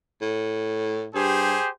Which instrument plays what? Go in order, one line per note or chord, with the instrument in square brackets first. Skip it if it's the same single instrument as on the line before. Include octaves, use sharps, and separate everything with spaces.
[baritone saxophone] A2
[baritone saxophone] G2 [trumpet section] G4 G#4 C5